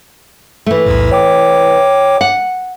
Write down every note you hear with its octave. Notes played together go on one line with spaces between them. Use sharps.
E3 A3
B1 E2 A2
C#5 G5 D6
F#5